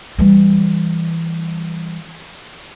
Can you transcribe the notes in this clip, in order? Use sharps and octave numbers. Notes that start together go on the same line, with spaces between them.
E3 G3